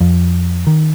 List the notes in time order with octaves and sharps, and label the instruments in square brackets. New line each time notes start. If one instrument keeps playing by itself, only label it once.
[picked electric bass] F2
D#3